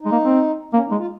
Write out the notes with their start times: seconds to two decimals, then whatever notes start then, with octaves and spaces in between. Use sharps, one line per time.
0.01 G#3 D#4
0.12 A#3
0.24 C4
0.73 A#3 C#4
0.86 D#4
0.91 G#3
0.98 F4